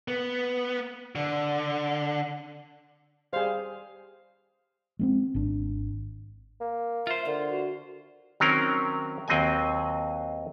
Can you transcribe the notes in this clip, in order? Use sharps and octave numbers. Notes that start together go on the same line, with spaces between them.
B3
D3
G3 G#4 C5 F5
G#3 A#3 C4
G#1 D4
A#3
F4 C5 E5
D3 A#4
F#4
D#3 F#3 C4 C#4 A#4
D#2 F#3 C4 D#5 G#5